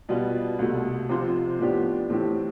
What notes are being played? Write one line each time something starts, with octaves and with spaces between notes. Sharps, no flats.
B2 G3 B3 F4
C2 B2 A3
C3 F3 C4 F4 C5
A2 F3 B3 D4 G4
A2 E3 A3 C4 G4